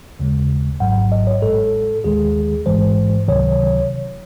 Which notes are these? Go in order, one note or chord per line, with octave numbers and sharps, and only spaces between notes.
D#2 C#3 G#3
G#1 G#2 F#3 F#5
D#5
C#5
A1 A2 G#3 A4
D#2 D#3 G#3 G#4
A1 G#2 E3 G#3 C5
C#2 C3 D#3 F#3 C#5